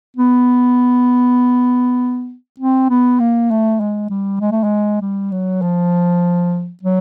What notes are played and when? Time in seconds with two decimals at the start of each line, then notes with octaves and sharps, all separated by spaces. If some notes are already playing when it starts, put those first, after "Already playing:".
0.17 B3
2.59 C4
2.90 B3
3.20 A#3
3.50 A3
3.80 G#3
4.10 G3
4.41 G#3
4.52 A3
4.64 G#3
5.01 G3
5.31 F#3
5.62 F3
6.83 F#3